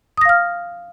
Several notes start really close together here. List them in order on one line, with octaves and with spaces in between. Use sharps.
D#6 A#6 F5 F6